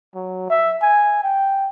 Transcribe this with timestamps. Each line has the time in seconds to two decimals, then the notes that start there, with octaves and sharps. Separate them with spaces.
0.15 F#3
0.50 E5
0.82 G#5
1.24 G5